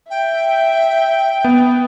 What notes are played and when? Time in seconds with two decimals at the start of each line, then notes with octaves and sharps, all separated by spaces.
0.10 E5 G5
1.44 B3